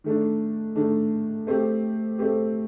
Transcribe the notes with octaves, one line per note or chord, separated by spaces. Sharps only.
D#3 A3 D4
D#3 A3 D4
A3 C4 G4
A3 C4 G4